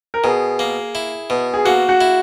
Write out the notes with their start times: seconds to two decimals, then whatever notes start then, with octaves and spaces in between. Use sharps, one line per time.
0.14 A#4
0.24 B2 G#4
0.59 A#3
0.95 E4
1.30 B2
1.54 G#4
1.65 A#3 F#4
1.89 F#4
2.01 E4